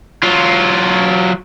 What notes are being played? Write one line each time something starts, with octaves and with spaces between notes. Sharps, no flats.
F#3 F4